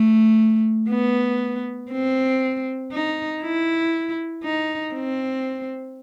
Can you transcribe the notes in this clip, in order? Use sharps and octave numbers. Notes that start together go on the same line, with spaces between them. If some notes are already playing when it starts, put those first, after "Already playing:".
Already playing: A3
B3
C4
D#4
E4
D#4
C4